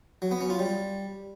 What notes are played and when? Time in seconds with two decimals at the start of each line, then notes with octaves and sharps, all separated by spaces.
0.22 F#3
0.31 B3
0.41 C#4
0.50 F4
0.59 G3